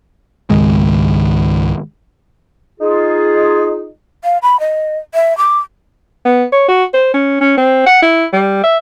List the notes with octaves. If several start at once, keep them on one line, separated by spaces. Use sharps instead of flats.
C#2 G#2 D#3 G#3
D#4 F4 G#4
F5
B5
D#5
E5
D6
B3
C#5
F#4
C5
C#4
C#4
C4
F#5
E4
G3
E5